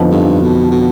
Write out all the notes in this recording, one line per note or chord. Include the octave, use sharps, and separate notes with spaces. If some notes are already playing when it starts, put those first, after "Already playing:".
Already playing: F2 D3 F3 B3 D#4
G2
B2
B2